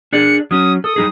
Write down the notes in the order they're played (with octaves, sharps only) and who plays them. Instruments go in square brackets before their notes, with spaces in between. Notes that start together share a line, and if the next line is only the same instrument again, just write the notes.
[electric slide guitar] D4 G#4 D5 [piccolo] C#7
[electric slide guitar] F#3 C#4 [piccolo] D#6
[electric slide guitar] A4 [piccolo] D#6
[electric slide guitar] G3 D#4 G#4